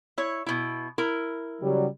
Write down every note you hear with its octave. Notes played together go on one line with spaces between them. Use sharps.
E4 C#5
B2 E4
E4 A#4
C#3 F#3 G3